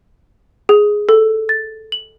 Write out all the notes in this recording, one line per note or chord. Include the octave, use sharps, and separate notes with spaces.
G#4
A4
A6
F#7